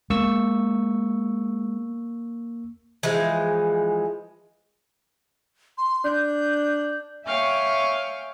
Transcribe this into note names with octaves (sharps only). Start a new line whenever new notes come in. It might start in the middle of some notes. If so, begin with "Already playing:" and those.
G#3 A#3 B3 C#6 E6
E3 F3 G#3
C6
D4 G6
C#5 E5 F5 G5 G#5